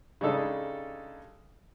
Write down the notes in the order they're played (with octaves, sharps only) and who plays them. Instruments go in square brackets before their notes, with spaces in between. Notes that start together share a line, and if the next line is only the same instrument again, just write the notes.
[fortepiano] C#3 G3 G#3 D4 D#4 A4